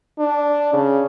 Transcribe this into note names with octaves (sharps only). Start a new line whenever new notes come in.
D4
C#3